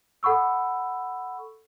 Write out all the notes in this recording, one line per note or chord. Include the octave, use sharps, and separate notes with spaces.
A4 F#5 B5 C#6 E6